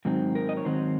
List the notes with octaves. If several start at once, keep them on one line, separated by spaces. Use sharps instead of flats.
G#2 D#3 F#3 C4
A#4
D#5
C#5
G#2 D#3 F#3 C4 C5